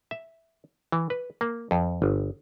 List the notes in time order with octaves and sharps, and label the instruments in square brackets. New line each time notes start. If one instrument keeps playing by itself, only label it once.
[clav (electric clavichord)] E5
E3
B4
A#3
F2
G1